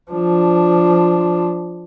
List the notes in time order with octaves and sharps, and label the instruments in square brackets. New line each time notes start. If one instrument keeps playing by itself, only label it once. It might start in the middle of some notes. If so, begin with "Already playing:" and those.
[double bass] F3 D4